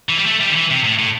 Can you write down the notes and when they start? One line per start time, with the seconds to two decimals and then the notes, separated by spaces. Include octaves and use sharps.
0.09 E3
0.18 G3
0.26 A3
0.40 G3
0.50 D3
0.56 E3
0.70 C3
0.84 A2
0.99 A2